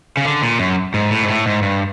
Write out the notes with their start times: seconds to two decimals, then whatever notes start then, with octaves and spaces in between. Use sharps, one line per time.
0.17 C#3
0.25 D3
0.42 A#2
0.59 F#2
0.94 G#2
1.11 A2
1.22 G#2
1.28 A2
1.46 G#2
1.62 G2